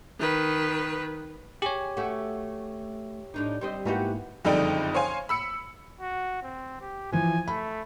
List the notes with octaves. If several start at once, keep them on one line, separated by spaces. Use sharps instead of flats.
D#3 B4
G4 G#4 C#5
A3 C#4 F#4
A2 D4 D#4
G3 C4 D#5
G#2 A#3 B3 E4 F#4 G4
F#1 F2 D3 G3 D#4 G5
C5 C#5 F5 G#5 C6
B5 E6 C#7
F#4
C4
G4
E3 F3 G#5
A3 B5